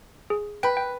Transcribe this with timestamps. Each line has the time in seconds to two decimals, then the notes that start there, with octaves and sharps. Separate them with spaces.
0.30 G#4
0.63 B4 G5 B5
0.77 G5